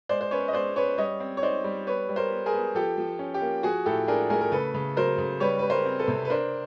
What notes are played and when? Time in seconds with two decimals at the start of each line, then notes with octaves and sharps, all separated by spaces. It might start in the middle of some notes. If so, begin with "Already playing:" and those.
0.09 G#3 C5 D5
0.21 C5
0.31 C#4 B4 C#5
0.48 D#5
0.53 G#3 C5 D5
0.76 C#4 B4 C#5
0.98 G3 C#5 D#5
1.20 C4
1.37 C#5
1.42 D#4 C5 D5
1.64 G3
1.86 B3 B4 C#5
2.09 G3
2.16 A#4 C5
2.31 B3
2.46 G#4 A#4
2.53 B3
2.75 F3 G4 A4
2.98 F3
3.19 C#4
3.34 G4
3.41 A#3
3.63 F3 F#4 G#4
3.86 A2 G4 A4
4.08 D4 G#4 A#4
4.30 A3 G#4 A#4
4.41 A#4
4.52 C#3 A4 B4
4.74 C#3
4.97 F#3 A#4 C5
5.18 C#3
5.40 G3 B4 C#5
5.59 G3 B4
5.70 A#4 C5
5.86 C4
5.99 A4 B4
6.08 C3
6.25 B4
6.29 D4 A#4 C5